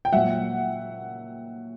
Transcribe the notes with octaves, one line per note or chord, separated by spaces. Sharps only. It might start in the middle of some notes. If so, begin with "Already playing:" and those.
G5
A#2 F#3 E5 F#5